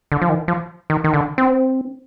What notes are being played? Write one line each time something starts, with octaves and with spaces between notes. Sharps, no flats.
D3
F3
D#3
F3
D#3
D#3
D3
C4